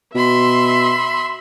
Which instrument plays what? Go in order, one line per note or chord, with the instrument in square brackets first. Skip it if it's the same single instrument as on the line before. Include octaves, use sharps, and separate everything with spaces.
[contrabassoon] B2 [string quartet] E5 B5 C6